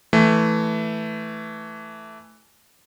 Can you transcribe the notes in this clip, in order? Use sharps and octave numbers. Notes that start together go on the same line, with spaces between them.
E3 A3